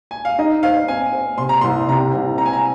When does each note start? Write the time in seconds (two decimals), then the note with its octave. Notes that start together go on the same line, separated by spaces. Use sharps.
0.11 G#5
0.25 F5
0.38 D#4 D#5
0.63 C5 F5
0.88 C4 G#5
1.13 C5
1.38 C3 C6
1.49 A#5
1.61 C2 C6
1.88 C3 A#5
2.14 C2
2.38 C4 A#5
2.46 G#5
2.53 A#5